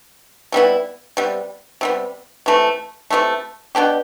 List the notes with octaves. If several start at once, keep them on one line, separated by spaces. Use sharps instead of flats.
C3 G3 B3 E4
C3 G3 B3
C3 G3 B3
C3 E3 A3
C3 E3 A3
B2 B3 D4 G4